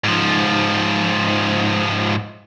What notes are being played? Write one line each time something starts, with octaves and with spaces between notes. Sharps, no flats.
G#2 F3